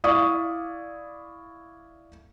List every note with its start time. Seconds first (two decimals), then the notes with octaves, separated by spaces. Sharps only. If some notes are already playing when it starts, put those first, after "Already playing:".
0.04 E4 D5 F5 C#6 D#6